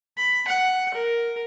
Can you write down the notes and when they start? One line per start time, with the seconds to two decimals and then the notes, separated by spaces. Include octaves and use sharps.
0.17 B5
0.48 F#5
0.94 A#4